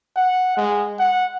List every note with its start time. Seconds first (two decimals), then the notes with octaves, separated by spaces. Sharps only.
0.16 F#5
0.57 G#3
0.99 F#5